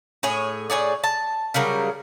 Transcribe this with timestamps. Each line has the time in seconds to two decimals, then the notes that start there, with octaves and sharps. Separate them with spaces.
0.23 A2 G#4 C#5
0.70 A2 G#4 C#5 D5
1.04 A5
1.54 C#3 F#3 G3 A#4